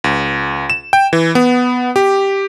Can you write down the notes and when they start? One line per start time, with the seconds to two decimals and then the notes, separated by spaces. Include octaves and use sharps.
0.04 C#2
0.70 E7
0.93 G5
1.13 E3
1.35 B3
1.96 G4